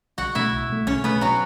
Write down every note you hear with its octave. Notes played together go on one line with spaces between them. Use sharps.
B1 F#4 F#5
B2 A3 E4 E5
B1
B2 A3
B1 C#4 C#5
B2 A3 B3 B4
F#3 F#4